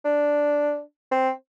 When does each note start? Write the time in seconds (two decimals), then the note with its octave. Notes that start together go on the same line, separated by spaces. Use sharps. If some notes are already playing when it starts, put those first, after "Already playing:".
0.05 D4
1.11 C4